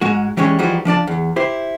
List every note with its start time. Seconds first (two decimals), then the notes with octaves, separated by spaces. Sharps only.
0.01 G#2 G#3 F#4
0.37 E3 G3 G#3 C#4 C#5
0.59 E3 F3 G3 D#4 F#4 G#4
0.85 F3 D4 D5 A5
1.07 E2
1.36 E4 G4 C5